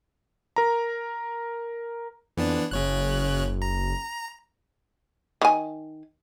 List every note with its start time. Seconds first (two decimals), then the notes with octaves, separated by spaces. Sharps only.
0.56 A#4 A#5
2.37 F2 E3 B3 D4
2.71 F#1 C#3 C#5 F#6
3.62 A#5
5.42 D#3 G#5